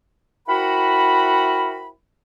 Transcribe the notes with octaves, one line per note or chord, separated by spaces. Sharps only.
C4 E4 F#4 A#4 F#5 B5